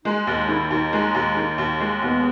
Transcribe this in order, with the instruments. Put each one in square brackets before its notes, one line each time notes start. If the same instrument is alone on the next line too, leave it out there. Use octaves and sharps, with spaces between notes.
[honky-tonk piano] G#3 [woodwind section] D#4
[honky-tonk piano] D#2 [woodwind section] D#4
[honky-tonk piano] D#3 [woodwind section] E4
[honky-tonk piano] D#2 [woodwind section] D#4
[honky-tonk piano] G#3
D#2
D#3
D#2
G#3
[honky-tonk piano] D#2 [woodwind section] B3